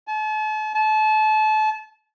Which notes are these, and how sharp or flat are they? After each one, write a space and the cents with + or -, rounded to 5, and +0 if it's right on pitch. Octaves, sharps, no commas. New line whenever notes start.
A5 -40
A5 -30